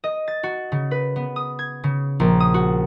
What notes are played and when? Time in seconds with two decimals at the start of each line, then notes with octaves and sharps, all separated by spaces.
0.04 D#5
0.28 A6
0.43 F#4
0.72 C#3
0.91 B4
1.16 B3
1.36 D#6
1.59 G#6
1.84 C#3
2.20 A#1
2.40 D#6
2.54 F#4